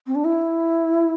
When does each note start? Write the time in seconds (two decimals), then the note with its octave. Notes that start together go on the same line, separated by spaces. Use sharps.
0.07 C4
0.15 D4
0.24 E4